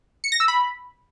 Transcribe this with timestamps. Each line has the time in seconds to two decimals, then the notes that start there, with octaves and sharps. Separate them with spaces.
0.24 C#7
0.32 A#6
0.40 E6
0.48 B5